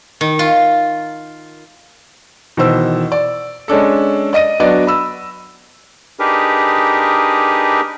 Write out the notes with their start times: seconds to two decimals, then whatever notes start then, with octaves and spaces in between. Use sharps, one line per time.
0.21 D#3
0.39 F4
2.57 B2 D#3 E3 C5 E6
3.12 D5
3.68 G#3 C#4 D4 A4
4.33 D5 D#5 A#6 D#7
4.60 F#3 B3 D4 F#4 D5 D#5
4.87 B5 E6
6.19 D4 D#4 G4 G#4 A#4 B4